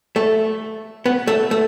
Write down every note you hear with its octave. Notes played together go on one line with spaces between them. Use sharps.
A3
B3
A3
A3